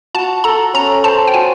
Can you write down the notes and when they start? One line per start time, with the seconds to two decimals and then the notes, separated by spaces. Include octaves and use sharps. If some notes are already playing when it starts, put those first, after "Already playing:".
0.14 F#4 A5
0.44 A4 A#5
0.74 C#4 A#5
1.04 C5 A5
1.27 G5
1.34 F#4 G#5